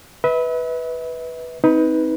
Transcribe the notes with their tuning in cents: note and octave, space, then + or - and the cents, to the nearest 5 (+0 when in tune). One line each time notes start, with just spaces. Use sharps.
B4 +0 E5 -40
C4 +0 D#4 +25 B4 +0